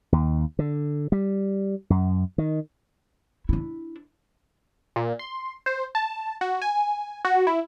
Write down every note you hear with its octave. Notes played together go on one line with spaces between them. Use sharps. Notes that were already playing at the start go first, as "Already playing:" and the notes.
D#2
D3
G3
F#2
D#3
D4 E4
A#2
C6
C5
A5
F#4
G#5
F#4
E4